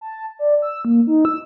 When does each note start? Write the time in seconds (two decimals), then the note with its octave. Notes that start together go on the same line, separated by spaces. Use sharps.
0.01 A5
0.39 D5
0.62 E6
0.85 A#3
1.07 D#4
1.25 E6